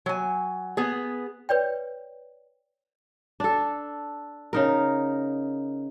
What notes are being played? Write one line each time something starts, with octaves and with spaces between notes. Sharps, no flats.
F#3 G#5
B3 G#4
B4 C#5 D5 G5
D4 A4
C#3 D#4 A#4